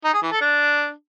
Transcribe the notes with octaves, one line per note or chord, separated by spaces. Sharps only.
D#4
G#4
E3
A4
D4